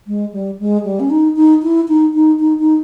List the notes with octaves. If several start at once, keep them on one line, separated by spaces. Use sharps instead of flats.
G#3
G3
G#3
G3
C#4
D#4
D#4
E4
D#4
D#4
D#4
D#4